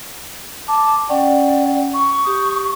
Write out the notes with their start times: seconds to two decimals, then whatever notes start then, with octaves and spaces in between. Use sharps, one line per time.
0.68 A5 D6
1.09 C#4 D5 F#5 G5
1.94 C#6
2.24 G4 D#6